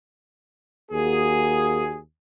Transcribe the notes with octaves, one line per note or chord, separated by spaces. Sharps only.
D#2 A#3 F#4 G#4